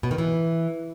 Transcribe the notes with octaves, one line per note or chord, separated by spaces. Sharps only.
B2
D#3
E3